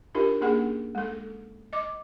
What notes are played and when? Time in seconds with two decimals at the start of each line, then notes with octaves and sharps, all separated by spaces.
0.15 D4 D#4 F4 G4 A#4
0.41 A#3 C#4 D4 G#4 F#5
0.95 G#3 A4
1.73 D#5 D6